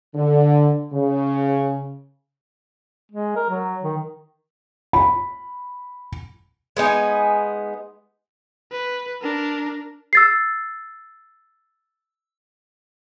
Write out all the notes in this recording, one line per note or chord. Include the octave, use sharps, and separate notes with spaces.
D3
C#3
G#3
A#4
F#3
D#3
B5
G#3 B3 D#4 G#5
B4
D4 A#4
E6 A6 C7